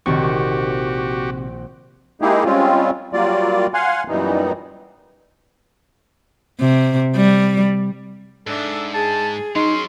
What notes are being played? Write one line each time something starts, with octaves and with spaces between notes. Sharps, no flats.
A#1 C3 D#3 C4 F#4 G4 D5 C#6
G#3 A#3 D#4 E4 G4 G#4
G3 G#3 C4 C#4 F4
F#3 G3 A#3 F4 D5
F5 F#5 G#5 C6
F#2 A#2 E3 G3 B3 D#4
C3
G3
G#2 D4 A4 E5
G#4 A5
F#3 C#4 D#4 C6